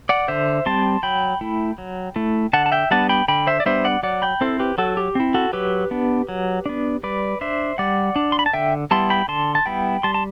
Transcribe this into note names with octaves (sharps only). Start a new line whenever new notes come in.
D5 F#5
D3 C5 E5
G3 C4 A5 C6
F#3 G5 B5
A3 E4
F#3
A3 E4
D3 F#5 A5
A5
E5 G5
G3 B3 D4 F#5 A5
G5 B5
D3 G5 B5
C5 E5
D5
G3 B3 D4 C5 E5
D5 F#5
F#3 D5 F#5
G5 B5
C4 E4 A4 C5
G4 B4
F#3 F#4 A4
G4
C4 E4
F#4 A4
F#3 G4 B4
B3 D4
F#3
B3 D4
G3 B4 D5
D4 C5 E5
G3 D5 F#5
D4
C6
B5
A5
D3 E5 G5
G3 B3 E4 A5 C6
G5 B5
D3 A5 C6
A5
G3 B3 E4 G5 B5
G3 A5 C6
A5